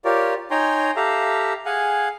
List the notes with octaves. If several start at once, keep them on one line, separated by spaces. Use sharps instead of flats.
F4 G4 A#4 C#5 D5
D#4 C#5 G5 G#5 A#5 C6
G4 A4 E5 F5 A#5
G#4 F5 F#5 G#5